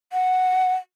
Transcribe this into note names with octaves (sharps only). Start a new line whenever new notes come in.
F#5